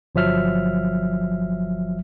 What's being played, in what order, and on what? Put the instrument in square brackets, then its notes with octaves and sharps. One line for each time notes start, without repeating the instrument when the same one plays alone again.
[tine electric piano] G1 F3 F#3 E5 F6